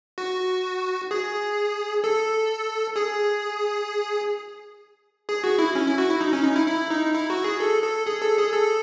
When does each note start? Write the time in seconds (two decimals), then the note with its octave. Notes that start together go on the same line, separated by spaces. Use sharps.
0.18 F#4
1.11 G#4
2.04 A4
2.96 G#4
5.29 G#4
5.44 F#4
5.59 E4
5.75 C#4
5.86 E4
5.98 F#4
6.10 E4
6.21 D#4
6.33 C#4
6.44 D#4
6.56 E4
6.67 E4
6.90 D#4
7.14 E4
7.30 F#4
7.44 G#4
7.60 A4
7.83 A4
8.07 G#4
8.22 A4
8.38 G#4
8.53 A4